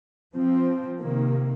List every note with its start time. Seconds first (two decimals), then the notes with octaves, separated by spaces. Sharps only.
0.34 F3 C4
0.99 C3 D#3 A#3